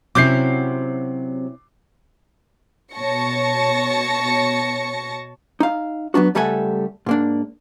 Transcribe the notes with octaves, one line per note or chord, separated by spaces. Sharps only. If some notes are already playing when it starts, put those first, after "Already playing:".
C3 F#3 C4 C#4 E4 D6 G6 C7
B2 C#5 A5 C#6 A#6 C#7
D#4 F5
F#3 B3 D4 F#4
C#2 G3 A3 A4 F#5 G#5
G#2 A#3 D4